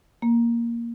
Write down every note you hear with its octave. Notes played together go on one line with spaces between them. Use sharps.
A#3